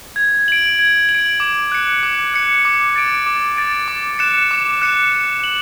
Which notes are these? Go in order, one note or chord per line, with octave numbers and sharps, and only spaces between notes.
G#6
D7 F#7
G#6
F#7
D7
D6
F#6 C#7
D6
F#6 C#7
D6
A6 D7
D6
A6 D7
D6
F#6 C#7 E7
D6
F#6 C#7 E7
F#6
F#7